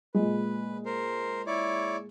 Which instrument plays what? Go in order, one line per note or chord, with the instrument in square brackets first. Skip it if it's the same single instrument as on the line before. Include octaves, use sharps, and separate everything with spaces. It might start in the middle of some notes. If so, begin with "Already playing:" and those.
[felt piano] A#2 G#3 [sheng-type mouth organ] B4
[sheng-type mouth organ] A#4 C5
E4 C#5 D5